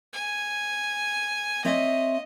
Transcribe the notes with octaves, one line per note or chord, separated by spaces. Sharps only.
G#5
C4 C#5 D#5 E5